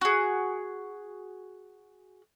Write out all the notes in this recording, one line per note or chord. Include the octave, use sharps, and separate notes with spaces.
F#4 G#4